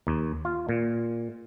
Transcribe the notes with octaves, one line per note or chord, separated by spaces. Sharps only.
D#2
F4
A#2